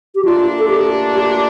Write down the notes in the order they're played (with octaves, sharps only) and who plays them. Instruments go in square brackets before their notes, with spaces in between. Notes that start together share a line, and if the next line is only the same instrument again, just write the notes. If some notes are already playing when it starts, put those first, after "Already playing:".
[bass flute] G4
[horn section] A#2 A3 D4 [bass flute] F4
[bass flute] A4
G4
G4